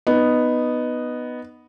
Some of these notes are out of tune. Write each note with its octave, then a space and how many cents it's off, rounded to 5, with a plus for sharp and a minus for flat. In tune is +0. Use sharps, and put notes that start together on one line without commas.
B3 +0 D#4 -10